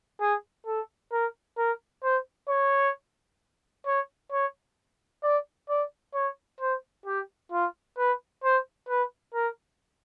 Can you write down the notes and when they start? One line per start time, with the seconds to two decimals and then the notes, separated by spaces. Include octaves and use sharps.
0.21 G#4
0.67 A4
1.12 A#4
1.58 A#4
2.03 C5
2.49 C#5
3.86 C#5
4.32 C#5
5.23 D5
5.69 D5
6.14 C#5
6.60 C5
7.06 G4
7.52 F4
7.98 B4
8.44 C5
8.89 B4
9.34 A#4